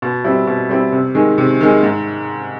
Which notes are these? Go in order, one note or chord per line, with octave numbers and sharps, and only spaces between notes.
B2
G3 C4 E4
B2
G3 C4 E4
C3
D#3 G#3
C3
D#3 G#3
G#2